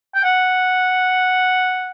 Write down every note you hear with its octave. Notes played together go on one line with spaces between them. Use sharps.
G5
F#5